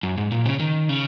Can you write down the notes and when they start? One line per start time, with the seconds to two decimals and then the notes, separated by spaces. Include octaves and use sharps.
0.03 F#2
0.18 G#2
0.32 A#2
0.46 C#3
0.60 D#3
0.89 C#3